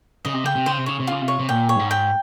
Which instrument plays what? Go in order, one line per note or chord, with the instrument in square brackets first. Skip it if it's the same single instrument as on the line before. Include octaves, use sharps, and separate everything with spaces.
[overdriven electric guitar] C#3 [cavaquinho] D#5
[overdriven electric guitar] C3
[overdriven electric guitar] C#3 [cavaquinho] G5
[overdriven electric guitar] C3
[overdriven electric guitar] C#3 [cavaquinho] C5
[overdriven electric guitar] C3
[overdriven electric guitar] C#3 [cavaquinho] C#5
[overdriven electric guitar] C3
[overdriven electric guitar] C#3 [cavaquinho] F4
[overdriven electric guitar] C3
[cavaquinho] C#5
[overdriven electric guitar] C3
[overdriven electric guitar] A#2 [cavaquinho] G5
[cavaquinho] C#5
[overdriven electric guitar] G2
G#2
[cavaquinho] G5